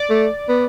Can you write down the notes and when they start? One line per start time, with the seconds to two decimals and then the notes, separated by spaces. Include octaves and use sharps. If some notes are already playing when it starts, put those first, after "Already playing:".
Already playing: D5
0.10 A3
0.49 B3